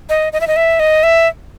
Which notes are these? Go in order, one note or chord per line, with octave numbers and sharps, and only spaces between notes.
D#5
D#5
E5
D#5
E5
D#5
E5